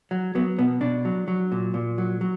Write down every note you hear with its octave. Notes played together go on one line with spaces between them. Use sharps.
F#3
F#3 B3
B2 B3
B2 D4
F#3
F#3
A#2
A#2
F#3
F#3